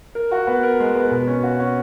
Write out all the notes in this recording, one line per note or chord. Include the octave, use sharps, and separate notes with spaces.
A#4
F#4
B3
A#4
G#3
B3
B2
C#4
F#4
C#4